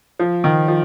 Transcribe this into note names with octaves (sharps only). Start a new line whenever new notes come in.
F3
D#3
F3